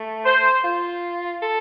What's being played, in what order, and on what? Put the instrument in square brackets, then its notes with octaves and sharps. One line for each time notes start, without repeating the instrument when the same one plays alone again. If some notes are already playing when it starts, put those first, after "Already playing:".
Already playing: [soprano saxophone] A3
[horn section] C5
[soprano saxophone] F4
A4